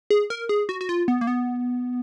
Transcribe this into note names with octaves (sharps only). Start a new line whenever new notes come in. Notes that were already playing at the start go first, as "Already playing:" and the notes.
G#4
A#4
G#4
F#4
F#4
F4
B3
A#3
B3